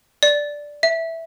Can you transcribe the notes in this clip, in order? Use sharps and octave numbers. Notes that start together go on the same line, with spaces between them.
D5
E5